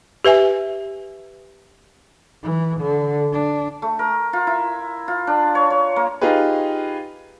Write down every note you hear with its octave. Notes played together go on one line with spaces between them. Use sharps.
G4 B4 E5 G#5
E3
D3
D4
A3
A#4
F4
E4
F4
D4
C#5
C#5
A#3
D#4 F4 G4 G#4 B4